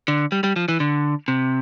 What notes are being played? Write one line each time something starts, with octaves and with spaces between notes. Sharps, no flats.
D3
G3
G3
F3
E3
D3
C3